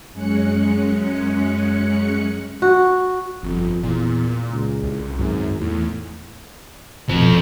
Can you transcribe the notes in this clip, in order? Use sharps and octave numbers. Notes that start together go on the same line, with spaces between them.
F#2 G#3 C#4 F#6 C#7
F#4
G1 F2
E2 A#2
C#2
C2
G#1 F#2
E2 A2
F1 A#1 B2 F3 C4